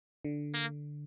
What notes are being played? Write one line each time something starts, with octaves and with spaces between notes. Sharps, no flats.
D3
A#3